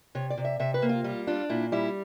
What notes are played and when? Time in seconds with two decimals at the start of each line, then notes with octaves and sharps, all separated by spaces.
0.15 C3 C#5
0.30 D5
0.38 C3
0.45 E5
0.60 C3 E5
0.74 B4
0.82 A#3
0.89 F4
1.04 G3 F4
1.27 D4 F4
1.50 A#2 E4
1.72 G3 E4